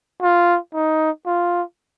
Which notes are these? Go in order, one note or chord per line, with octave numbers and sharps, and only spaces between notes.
F4
D#4
F4